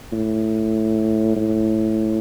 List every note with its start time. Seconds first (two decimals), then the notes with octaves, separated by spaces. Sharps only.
0.12 A2
1.36 A2